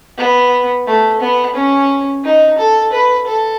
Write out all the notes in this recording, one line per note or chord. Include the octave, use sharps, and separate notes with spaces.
B3
A3
B3
C#4
D#4
A4
B4
A4